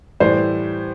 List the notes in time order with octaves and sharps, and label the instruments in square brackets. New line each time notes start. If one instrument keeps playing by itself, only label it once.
[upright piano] A2 E3 G3 [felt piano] C5